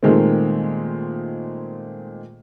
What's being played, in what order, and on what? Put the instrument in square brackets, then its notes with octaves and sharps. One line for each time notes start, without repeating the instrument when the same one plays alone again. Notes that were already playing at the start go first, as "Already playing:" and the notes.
[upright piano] A#2 D#3 G#3 A3 C4